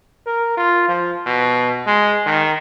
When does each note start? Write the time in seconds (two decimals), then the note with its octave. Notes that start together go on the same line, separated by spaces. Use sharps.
0.26 A#4
0.57 F4
0.88 F3
1.26 B2
1.87 G#3
2.26 D#3